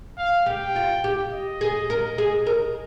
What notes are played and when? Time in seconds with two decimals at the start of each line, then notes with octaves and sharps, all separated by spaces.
0.18 F5
0.46 G4 G5
0.76 F4
1.04 G4
1.32 D#5
1.61 G#4
1.90 A#4
2.18 G#4
2.47 A#4